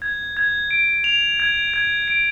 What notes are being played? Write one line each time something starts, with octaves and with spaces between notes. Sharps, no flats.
G#6
G#6
D7
F7
G#6
G#6
D7